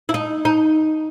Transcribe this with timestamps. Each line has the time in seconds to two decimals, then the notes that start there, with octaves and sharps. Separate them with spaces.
0.09 E4
0.14 D#4
0.45 D#4